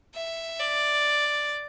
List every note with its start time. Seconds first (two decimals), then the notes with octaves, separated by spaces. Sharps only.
0.14 E5
0.59 D5